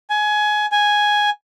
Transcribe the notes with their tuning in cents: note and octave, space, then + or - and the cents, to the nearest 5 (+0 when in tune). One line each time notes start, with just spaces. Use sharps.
G#5 +20
G#5 +0